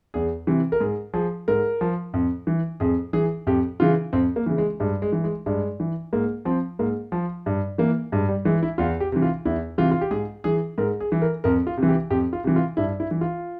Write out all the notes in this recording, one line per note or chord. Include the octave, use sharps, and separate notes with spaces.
E2 G#4
C3 E3
A#4
G#2 G#4
F3 G#4
G#2 A#4
F3
F2
E3
F2 G#4
E3 G#4
F2 G4
C#3 E3 F4
F2 C4
A#3
C#3 E3
G#3
G2 G#3
G#3
E3
G#3
G2 G#3
E3
G#2 A#3
F3 C4
G#2 A#3
F3
G2
E3 A#3
G2 G#3
G3
E3 G#3
E4
E2 F4
G4
C3 E3
F4
E2 E4
C3 E3 F4
F4
G4
G#2 G#4
E3 G#4
G#2 A#4
G#4
E3
A#4
F2 A#4
F4
C3
E3
G4
F2 G4
F4
C3 E3
F4
G2 E4
E4
E3
F4